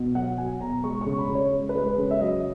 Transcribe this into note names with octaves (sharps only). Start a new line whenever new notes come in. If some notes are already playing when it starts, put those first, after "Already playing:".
Already playing: B2
F#3 F#5
F#3 G#5
B2 A#5
G#3 C#6
C#3 C#6
B5
C#3
C#5
G#3
B4
G#3
B4
C#3
E5
F#3 D#5